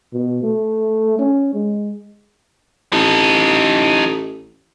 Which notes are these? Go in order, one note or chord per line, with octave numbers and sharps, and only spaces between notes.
B2
A3
C#4
G#3
A1 D#4 A4